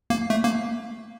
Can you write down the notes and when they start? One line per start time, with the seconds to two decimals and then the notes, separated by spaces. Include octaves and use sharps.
0.10 A#3
0.30 A3
0.44 A#3